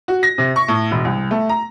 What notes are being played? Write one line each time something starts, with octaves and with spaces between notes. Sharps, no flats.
F#4
A#6
C3
C#6
A2
E1
C2
A3
A#5